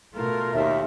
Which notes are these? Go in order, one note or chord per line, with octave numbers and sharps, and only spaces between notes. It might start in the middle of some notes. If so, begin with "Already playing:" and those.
B2 A3 F4 A#4
D#2 E5